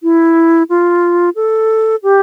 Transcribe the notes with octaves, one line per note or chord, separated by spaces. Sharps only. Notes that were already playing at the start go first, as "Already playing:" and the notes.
E4
F4
A4
G4